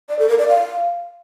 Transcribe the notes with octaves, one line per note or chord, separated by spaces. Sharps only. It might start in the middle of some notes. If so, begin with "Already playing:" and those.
D5
A4
A#4
D5
F5